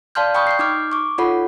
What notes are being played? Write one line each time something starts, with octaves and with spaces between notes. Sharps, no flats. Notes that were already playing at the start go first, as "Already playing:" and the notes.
D5 F5 A5 C6 F6 G6
G5 B5 C#6 D#6 G6
G6 C7
D#4 D6 F6
C#6 D6
D#4 F4 A4 C#5 F#5 B5